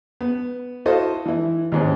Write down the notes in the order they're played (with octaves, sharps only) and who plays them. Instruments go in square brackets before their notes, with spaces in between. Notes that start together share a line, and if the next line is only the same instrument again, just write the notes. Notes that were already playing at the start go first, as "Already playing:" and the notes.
[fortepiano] B3
E4 F#4 A4 C5 D#5 F5
E3 E4
D#2 G#2 C#4